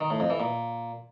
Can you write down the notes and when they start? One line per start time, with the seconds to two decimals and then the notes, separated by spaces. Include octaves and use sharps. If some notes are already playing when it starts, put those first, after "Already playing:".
0.01 D#3
0.10 A2
0.20 F2
0.30 E3
0.40 A#2